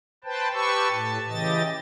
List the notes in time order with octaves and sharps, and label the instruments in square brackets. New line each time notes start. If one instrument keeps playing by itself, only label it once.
[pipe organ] B4 C5 G5 A5
G4 B4 A5 C#6 E6
A2 A5
C#3 E3 G4 D#5 A6